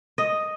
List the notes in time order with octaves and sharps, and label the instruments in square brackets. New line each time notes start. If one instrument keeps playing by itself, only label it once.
[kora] D#5